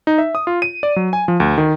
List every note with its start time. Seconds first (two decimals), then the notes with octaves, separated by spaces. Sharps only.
0.07 D#4
0.18 E5
0.35 D#6
0.47 F4
0.62 D#7
0.83 D5
0.96 F#3
1.13 G#5
1.28 F3
1.40 D2
1.58 D#3